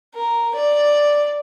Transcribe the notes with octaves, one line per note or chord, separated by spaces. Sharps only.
A#4
D5